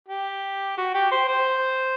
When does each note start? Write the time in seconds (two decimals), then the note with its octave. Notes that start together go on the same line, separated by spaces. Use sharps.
0.09 G4
0.77 F#4
0.95 G4
1.12 C5
1.28 C5